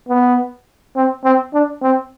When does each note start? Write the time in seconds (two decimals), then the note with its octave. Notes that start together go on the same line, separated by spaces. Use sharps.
0.09 B3
0.96 C4
1.24 C4
1.54 D4
1.82 C4